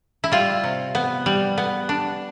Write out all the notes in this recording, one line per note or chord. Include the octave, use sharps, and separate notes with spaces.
E4
G3 F4
C3
B3
G3
B3
D4